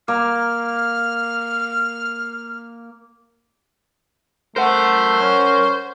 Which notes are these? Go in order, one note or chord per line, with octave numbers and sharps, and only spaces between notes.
A#3 F6
A3 A#4 C5 F#5
C#4